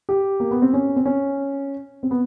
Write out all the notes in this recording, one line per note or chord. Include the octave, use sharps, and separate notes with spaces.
G4
A#3
B3
C4
C#4
C4
C#4
C4
B3